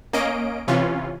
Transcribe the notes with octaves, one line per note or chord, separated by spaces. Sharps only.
A#3 C#4 D#5 D7
C3 E3 C#4 F4